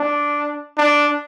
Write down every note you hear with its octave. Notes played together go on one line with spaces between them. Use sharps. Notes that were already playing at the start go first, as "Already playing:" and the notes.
Already playing: D4
D4